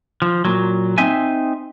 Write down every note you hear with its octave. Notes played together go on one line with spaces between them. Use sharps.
F3
A#2 F#3
C4 D#4 E5 G#5